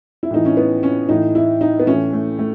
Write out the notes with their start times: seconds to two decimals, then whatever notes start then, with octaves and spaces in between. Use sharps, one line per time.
0.23 E4
0.31 A2 E3 D#4
0.46 C#4
0.57 B3
0.83 C#4
1.09 A2 E3 D#4
1.35 E4
1.61 D#4
1.80 B3
1.87 A2 E3 C#4
2.13 A3
2.39 A3